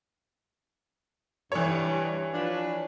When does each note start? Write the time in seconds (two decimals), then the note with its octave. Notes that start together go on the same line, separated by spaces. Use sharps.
1.52 G2 E3 C#5
2.33 F3 D4 B4